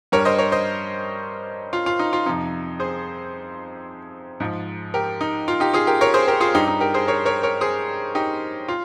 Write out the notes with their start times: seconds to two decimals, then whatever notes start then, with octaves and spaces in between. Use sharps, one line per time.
0.12 G2 G3 A#4 C#5
0.25 C5 D#5
0.38 A#4 C#5
0.52 C5 D#5
1.73 F4
1.86 F4
1.99 D#4
2.13 F4
2.26 F2 C3 F3 D#4
2.80 G#4 C5
4.40 G#2 F3
4.94 G4 A#4
5.21 D#4
5.48 F4
5.60 D#4 G4
5.74 F4 G#4
5.87 G4 A#4
6.01 A#4 C#5
6.14 G#4 C5
6.28 G4 A#4
6.40 F4 G#4
6.54 G2 G3 D#4 G4
6.67 D#4
6.80 G4 A#4
6.94 G#4 C5
7.07 A#4 C#5
7.25 A#4 C#5
7.43 A#4 C#5
7.61 G#4 C5
8.15 D#4 G4
8.68 F4